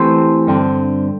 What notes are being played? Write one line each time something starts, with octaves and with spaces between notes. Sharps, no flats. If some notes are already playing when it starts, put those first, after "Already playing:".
Already playing: E3 A3 C4 G4 C5
G2 D3 C4